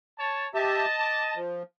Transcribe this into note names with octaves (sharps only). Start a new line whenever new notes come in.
C#5 A5
G4 D#5 E5 A5
D6
F3